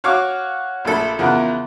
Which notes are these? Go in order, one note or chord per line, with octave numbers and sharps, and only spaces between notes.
F#4 C#5 F5 D6
A#1 A3 A4 B5
E2 C#3 F3 A#4 F#5